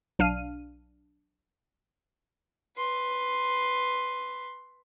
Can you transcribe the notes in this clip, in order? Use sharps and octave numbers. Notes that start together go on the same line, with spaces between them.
B1 D4 F5 F6 D#7
B4 C6